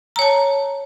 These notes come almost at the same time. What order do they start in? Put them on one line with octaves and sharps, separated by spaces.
A#5 C#5 A5